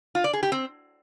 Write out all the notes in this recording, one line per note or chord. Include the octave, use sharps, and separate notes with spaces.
F4
D5
G#4
G4
C4